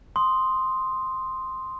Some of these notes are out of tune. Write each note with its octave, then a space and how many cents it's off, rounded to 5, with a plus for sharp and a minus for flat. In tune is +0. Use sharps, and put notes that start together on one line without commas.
C6 +0 D#6 +0